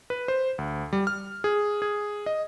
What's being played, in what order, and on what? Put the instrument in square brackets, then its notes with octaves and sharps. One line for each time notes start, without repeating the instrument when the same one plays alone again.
[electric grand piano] B4
C5
D2
G3
F6
G#4
G#4
D#5